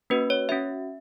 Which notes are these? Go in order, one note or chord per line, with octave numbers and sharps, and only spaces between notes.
A#3 C#4 F#4 B4
C#5
C#4 F#4 E5